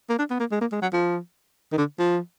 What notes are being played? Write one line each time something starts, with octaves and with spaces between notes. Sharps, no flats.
A#3
D4
B3
A#3
G#3
A#3
G#3
F#3
F3
D#3
D3
F3